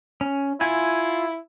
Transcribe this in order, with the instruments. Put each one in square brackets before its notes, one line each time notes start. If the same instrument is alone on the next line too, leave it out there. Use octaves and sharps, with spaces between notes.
[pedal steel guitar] C#4
[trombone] E4 [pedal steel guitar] F4 G#5